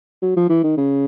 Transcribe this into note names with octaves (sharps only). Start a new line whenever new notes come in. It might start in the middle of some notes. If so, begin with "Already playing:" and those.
F#3
F3
E3
D#3
C#3